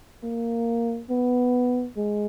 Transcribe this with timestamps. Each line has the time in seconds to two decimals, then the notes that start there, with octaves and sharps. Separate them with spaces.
0.23 A#3
1.10 B3
1.97 G#3